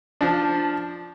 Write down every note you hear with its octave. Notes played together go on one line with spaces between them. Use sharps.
F3 D4